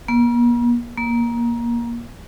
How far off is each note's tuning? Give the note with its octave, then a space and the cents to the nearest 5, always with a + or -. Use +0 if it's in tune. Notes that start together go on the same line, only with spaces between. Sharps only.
A#3 +45
A#3 +20